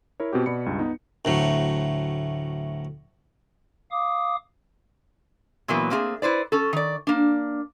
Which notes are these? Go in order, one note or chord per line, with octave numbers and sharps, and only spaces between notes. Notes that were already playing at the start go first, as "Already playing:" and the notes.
E4 A#4 C#5
B2 C4 F#4 G4
B2 D5 B5 C#7
C#2 G2
B3 D#4
D2 A2 F#3
F5 D6 D#6
A#2 E3 F#3 A#3 B3
A3 A#3 C4 F#4 G#4
E4 B4 C5 D5
C#4 A4
D#3 D5
A#3 D4